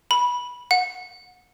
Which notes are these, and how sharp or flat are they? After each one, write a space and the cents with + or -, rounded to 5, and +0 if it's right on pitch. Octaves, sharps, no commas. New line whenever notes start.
B5 -15
F#5 -30